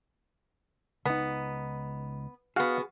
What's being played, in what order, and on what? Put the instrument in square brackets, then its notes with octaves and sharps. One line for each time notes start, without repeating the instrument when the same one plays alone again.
[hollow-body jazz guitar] C#2 D#4 [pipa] B3
[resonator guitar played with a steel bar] B3 F#4 [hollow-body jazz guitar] G#4 [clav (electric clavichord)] F5 F#5